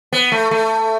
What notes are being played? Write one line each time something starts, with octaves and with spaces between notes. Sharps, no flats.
B3
A3
A3